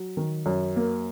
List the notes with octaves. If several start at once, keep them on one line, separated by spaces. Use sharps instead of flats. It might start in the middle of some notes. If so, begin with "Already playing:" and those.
Already playing: F#3
D#3
F#2
A#3